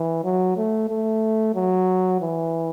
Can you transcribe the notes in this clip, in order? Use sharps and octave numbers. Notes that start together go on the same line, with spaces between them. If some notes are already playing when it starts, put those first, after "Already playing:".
Already playing: E3
F#3
A3
A3
F#3
E3